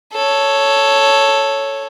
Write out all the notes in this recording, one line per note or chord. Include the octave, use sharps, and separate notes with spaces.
A4 C#5